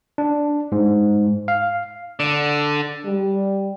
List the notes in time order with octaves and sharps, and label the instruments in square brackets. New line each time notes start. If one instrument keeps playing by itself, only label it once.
[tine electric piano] D4
G#2
F5
[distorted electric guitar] D3
[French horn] G3